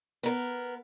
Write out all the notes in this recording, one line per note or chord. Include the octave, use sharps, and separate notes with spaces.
B3 A#4